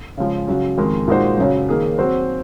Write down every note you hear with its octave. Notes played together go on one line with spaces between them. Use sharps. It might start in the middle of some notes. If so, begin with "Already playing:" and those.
C#3 F3 G#3
C#3 F#3 C#4
F2 D#3 G#3
A#2 G#3 D#4 F#4 C5
F#2 C#3 F#3
D#3 A#3 D#4 G#4
F#3 C4 F#4 C5